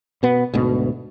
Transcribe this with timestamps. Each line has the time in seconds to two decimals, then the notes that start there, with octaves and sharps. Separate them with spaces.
0.23 B2 B3
0.54 D2 G#2 B2